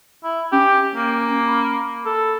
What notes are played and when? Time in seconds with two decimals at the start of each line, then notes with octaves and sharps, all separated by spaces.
0.24 E4
0.52 C#4 G4
0.95 A#3
1.47 B5
2.06 A4